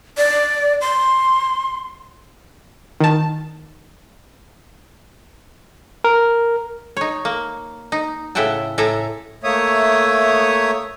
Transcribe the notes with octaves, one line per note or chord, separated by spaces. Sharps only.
D5
C6
D#3 A5
A#4
D#4 C#5
A#3
D#4
A2 C#3 E5 F#5 G5 A5
A2 A4 E5 G#5 A#5
A3 A#3 C#5 E5 D#6